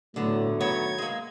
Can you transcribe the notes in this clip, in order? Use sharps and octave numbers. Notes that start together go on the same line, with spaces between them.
A2 D3 F#3 A3 B3
D#3 B3 C#5 G#6
G#3 A#3